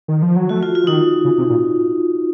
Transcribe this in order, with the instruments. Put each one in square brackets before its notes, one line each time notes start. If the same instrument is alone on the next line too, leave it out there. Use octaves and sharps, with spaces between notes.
[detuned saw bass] D#3
F3
F#3
[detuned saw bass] A3 [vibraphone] F#4
[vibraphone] F4
F4
[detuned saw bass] F3
[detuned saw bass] D#3 [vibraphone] D#4
[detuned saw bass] C#3
C3
A#2